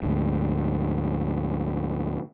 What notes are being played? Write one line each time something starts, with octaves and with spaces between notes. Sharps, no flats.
D2 G#2